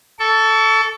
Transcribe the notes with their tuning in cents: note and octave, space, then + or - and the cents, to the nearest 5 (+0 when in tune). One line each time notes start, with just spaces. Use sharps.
A4 +0 C#6 +35